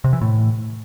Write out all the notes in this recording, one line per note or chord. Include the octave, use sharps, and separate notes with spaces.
C3
E3
A2